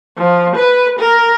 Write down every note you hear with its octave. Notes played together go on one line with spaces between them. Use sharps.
F3
B4
A#4